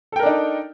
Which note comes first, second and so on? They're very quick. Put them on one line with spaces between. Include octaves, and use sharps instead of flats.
A4 G5 A#4 D4 D#4